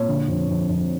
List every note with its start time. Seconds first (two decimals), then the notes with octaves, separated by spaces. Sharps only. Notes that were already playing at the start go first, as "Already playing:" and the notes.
Already playing: A#2 C#5
0.08 D3
0.28 F2
0.48 F2
0.68 F2